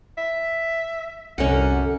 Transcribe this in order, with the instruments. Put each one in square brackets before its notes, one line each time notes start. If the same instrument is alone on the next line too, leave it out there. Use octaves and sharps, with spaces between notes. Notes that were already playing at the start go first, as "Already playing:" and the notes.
[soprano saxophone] E5
[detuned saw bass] C2 [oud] F#2 D3 [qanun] C#4 A#4 [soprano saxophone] F#5